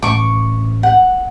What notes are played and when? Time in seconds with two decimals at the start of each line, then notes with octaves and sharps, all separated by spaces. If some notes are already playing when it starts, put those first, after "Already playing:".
0.02 A1 C#6 D6
0.83 F#5